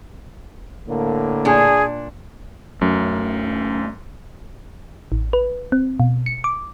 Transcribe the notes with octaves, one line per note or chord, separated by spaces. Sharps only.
A2 D3 A#3
A#2 D4 G#4
F#2 F#3 A3 C#4
A1
B4
C4
B2
C#7
D6